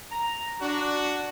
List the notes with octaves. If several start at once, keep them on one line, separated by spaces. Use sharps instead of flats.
A#5
D4 F#4